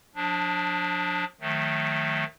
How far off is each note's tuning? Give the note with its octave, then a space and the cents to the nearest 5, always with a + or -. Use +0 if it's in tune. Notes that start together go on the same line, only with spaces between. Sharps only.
F3 +40 D4 +0
D#3 +5 F#3 -40 A3 +0